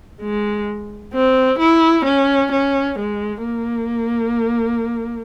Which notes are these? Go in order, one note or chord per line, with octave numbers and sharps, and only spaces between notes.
G#3
C4
E4
C#4
C#4
G#3
A#3